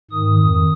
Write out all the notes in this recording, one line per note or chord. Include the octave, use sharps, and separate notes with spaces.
G#2 D#3 D#6
F2 D#3 D#6